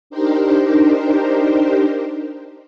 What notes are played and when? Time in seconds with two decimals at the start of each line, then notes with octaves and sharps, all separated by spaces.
0.10 D4 D#4 G4 A#4 C5